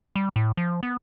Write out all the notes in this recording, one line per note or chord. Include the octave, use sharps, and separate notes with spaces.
G3
A2
F3
B3